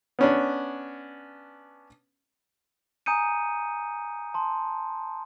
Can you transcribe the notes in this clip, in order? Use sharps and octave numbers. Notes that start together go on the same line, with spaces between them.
B3 C#4 D4
G#5 A#5 D#6 G6 C#7 D#7
A5 C6